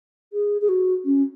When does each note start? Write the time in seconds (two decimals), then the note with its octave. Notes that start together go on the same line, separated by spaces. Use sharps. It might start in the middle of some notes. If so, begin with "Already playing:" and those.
0.33 G#4
0.61 G#4
0.69 F#4
1.05 C#4